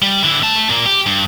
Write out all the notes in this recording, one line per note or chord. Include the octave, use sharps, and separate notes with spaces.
G3
D3 E4
A3 A5
A#2 A#3
G4
G2